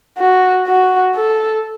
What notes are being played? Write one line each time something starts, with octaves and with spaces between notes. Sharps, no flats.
F#4
F#4
A4